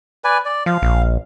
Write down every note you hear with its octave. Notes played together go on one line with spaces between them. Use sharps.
B4 D5 G#5
D5
F3 F5
A#1